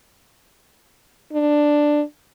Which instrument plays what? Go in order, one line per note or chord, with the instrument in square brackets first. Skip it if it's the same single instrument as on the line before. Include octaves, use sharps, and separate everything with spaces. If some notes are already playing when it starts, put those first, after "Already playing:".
[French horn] D4